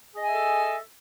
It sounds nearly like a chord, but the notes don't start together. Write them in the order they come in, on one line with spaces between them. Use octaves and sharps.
G#4 D#5 G#5 E5 A4